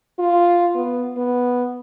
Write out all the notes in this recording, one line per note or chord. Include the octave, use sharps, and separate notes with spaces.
F4
B3
B3